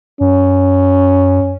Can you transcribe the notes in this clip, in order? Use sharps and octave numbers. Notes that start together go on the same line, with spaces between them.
F#2 C#4